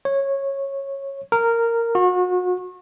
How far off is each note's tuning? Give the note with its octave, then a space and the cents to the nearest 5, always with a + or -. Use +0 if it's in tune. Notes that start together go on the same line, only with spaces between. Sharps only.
C#5 -15
A#4 -10
F#4 -35